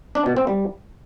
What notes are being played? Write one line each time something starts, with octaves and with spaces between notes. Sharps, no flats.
D4
B2
C4
G3